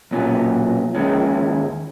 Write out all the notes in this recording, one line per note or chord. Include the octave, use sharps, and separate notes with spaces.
B1 A#2 F#3 C#4
D#2 D#3 G#3 C#4